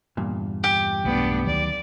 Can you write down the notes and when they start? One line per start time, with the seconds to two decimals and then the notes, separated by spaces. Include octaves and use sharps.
0.17 E2 G2 A#2
0.64 G4
1.04 B1 A3 B3 D4
1.46 D2 D#3 F#3 D5